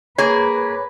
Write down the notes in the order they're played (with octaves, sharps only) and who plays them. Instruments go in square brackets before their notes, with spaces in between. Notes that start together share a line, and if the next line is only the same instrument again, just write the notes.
[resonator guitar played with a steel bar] A#3 G#4 [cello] B4 [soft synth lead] C#5